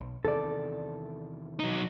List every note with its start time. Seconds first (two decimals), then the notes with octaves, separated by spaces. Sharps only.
0.01 B1
0.25 E2 C3 D#3 A4 D5
1.59 F#3 D#4